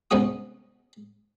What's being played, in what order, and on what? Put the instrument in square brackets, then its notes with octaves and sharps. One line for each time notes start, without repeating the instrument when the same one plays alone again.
[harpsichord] C2 G#2 B3 C#4 F#4 D#6